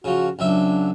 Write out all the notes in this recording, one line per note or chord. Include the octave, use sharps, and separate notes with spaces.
C#3 F3 F#4
C#2 F#3 D4 E5